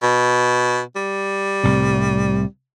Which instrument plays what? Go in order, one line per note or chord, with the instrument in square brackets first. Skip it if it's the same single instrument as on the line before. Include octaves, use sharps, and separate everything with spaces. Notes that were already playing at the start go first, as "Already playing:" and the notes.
[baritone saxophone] B2
G3
[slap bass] C2 A2 C3